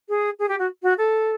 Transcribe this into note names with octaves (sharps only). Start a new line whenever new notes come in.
G#4
G#4
G4
F#4
F#4
A4